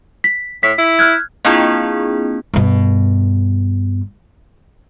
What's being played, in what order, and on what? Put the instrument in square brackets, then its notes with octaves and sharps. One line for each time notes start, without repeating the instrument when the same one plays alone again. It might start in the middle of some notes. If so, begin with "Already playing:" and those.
[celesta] B6
[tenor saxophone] A2 [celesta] B6
[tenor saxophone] E4
[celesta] F6 F#6 G#6
[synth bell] A#3 C4 D4 E4 F4 G#4
[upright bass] G2 B2